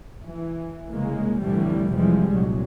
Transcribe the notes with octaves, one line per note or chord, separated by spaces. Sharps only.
E3
C2 C#3 G#3 A#3
F1 C2 A2 D3 E3 G3
F2 C3 E3 F3 G3 G#3
C2 F2 A#2 F#3